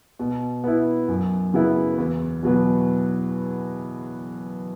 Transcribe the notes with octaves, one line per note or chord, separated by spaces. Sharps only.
B2
B3 E4
F#2
C#3 F#3 B3 E4
E2
B2 F#3 B3